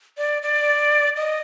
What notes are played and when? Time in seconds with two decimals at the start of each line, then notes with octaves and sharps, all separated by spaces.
0.18 D5
0.42 D5
1.17 D#5